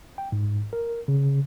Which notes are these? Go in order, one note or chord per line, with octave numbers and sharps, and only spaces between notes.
G5
G#2
A#4
C#3